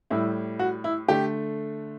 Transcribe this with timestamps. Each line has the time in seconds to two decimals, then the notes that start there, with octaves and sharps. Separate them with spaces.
0.10 A2 G3 E4
0.59 F#4
0.84 E4
1.08 D3 A3 G4